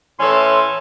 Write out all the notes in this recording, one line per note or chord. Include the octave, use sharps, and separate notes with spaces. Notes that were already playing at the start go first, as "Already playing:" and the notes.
A2 E3 C#4 A4 C#5 C6